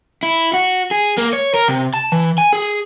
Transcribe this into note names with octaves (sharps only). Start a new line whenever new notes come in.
E4
F#4
G#4
A#3
C#5
A#4
C3
A5
E3
G#5
G#4